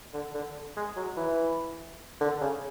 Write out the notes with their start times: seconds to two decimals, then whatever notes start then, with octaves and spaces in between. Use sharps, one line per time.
0.14 D3
0.35 D3
0.76 G#3
0.96 F#3
1.17 E3
2.21 D3
2.41 C#3